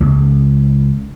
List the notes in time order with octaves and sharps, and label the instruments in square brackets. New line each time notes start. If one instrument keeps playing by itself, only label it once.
[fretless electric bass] C#2